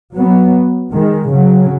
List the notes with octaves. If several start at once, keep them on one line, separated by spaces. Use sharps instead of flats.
F#3 B3
D#3 G#3
C#3 F#3